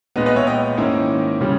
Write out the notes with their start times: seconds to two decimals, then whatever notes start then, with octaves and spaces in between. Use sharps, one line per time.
0.16 A#2 G#3 B3 B4 D#5
0.26 B4 D#5
0.36 C#5 E5
0.47 D#5 G5
0.77 G#2 D#3 A#3 C#4 E4
1.41 C#3 G3 C#4